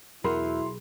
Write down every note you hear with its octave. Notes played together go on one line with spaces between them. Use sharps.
B1 E2 E4 F#4 G#4 A#4 B5 C6